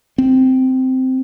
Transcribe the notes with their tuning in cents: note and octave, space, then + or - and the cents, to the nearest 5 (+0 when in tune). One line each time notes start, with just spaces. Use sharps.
C4 -10